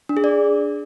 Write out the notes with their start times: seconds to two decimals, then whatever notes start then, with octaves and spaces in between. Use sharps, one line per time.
0.09 D4
0.17 G#4
0.24 D5